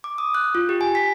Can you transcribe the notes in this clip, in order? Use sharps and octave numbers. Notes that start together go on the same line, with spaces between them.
D6
D#6
F#6
F4
G4
G#5
B6